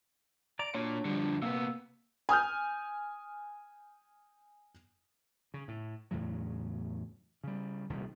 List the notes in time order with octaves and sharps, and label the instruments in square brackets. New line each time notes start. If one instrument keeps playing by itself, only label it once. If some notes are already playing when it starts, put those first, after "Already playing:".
[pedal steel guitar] D5 A#5 D6 [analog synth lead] D7
[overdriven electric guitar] A#2 [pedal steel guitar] D4 F#4 [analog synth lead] C#5
[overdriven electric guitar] D3 F3 [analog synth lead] G3
[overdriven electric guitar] C3 B3 [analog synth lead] A#3 [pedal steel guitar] E6
[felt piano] G#5 D#6 F6 G6
[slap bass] C#3
A2
E2 A2 C#3 F#3
C#3 G3
D#1 C2 C3 D#3